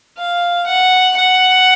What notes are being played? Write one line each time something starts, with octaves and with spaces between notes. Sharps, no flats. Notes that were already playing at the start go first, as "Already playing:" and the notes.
F5
F#5
F#5